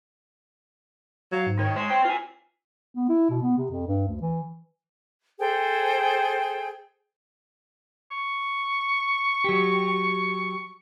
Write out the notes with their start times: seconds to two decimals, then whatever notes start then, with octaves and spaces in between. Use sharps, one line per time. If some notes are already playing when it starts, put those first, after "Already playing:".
1.32 F#3 F5
1.46 G#2
1.59 D#3 C#5
1.76 G#3 C5 C7
1.90 C5 G5
2.05 F4 G#5
2.95 B3
3.09 E4
3.30 B2
3.42 B3
3.57 C3
3.71 F2
3.87 G2
4.08 D2
4.21 E3
5.39 G#4 A4 C5 G5
8.12 C#6
9.44 F#3 G4